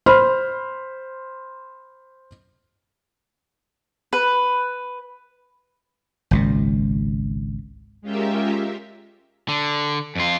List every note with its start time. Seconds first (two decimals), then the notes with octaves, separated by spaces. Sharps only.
0.06 C5 B5 C6 F6
4.13 B4
6.31 G#1 C#2 A#2
8.02 G#3 C#4 F4 G4 A#4 E5
9.49 D3
10.15 F2 F4